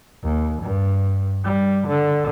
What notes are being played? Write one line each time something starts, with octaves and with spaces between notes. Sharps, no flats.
D#2
G2
G3
D3